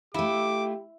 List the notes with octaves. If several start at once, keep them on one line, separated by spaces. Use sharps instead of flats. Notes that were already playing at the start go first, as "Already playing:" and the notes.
A3 E4 F4 G4 D6